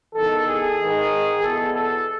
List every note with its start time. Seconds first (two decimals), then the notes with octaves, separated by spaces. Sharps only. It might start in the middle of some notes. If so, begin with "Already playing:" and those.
0.15 E2 D#3 A4
0.47 G#4
0.79 G#2 D#3
1.43 E2 B2 A4
1.74 A4